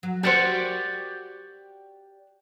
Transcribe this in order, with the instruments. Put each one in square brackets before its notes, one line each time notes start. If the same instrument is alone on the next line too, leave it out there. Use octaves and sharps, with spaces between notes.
[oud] F#3
[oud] F#4 A#4 C5 [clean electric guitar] G4 D5 F#5